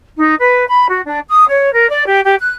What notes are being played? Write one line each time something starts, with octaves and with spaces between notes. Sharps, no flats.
D#4
B4
B5
F#4
D4
D#6
C#5
A#4
D5
G4
G4
F#6